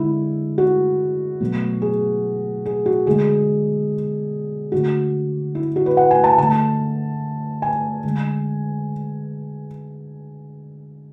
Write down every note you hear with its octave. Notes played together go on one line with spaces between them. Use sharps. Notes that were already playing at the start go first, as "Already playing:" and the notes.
Already playing: D3 G#3 E4
F#4
B2 F#3 A3
G#4
G#4
F#4
D3 G#3 G#4
D3 A3 F#4
E4
F#4
B4
F#5
G#5
A5
D3 A3 A5
G#5
D3 G#3